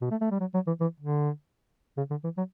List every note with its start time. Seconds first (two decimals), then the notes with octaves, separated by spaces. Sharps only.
0.01 B2
0.11 A3
0.21 A3
0.31 G3
0.40 F#3
0.54 F#3
0.67 E3
0.80 E3
1.00 D3
1.97 C#3
2.10 D3
2.24 E3
2.37 F#3